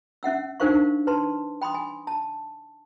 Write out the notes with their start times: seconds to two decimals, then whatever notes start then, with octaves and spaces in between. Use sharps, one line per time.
0.23 C#4 E5 F#5 E6
0.60 D4 D#4 A#4 C5 F5 C#6
1.07 B4 A5 C6
1.62 G5 B5 C6 D#6
1.74 G#5
2.07 A5